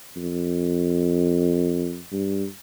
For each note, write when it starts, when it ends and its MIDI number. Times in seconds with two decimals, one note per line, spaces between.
0.17 1.99 41
2.12 2.46 43